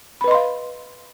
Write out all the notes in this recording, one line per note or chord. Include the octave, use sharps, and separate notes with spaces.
B4 D#5 F5 B5 C6